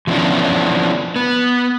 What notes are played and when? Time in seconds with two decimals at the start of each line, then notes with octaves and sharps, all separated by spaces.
0.07 E3 F3 B3 C#4 D4 E4
1.16 B3